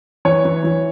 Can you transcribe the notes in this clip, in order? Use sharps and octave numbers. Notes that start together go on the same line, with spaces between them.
E3 C#5
E3
E3